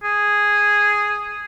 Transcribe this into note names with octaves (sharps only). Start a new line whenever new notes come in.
G#4